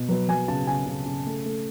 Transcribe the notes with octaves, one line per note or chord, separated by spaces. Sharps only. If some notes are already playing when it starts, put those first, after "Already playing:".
Already playing: B2
F#3 B4
F#3 G#5
C#3 A5
C#3 G#5
C#3
C#3
A3
A3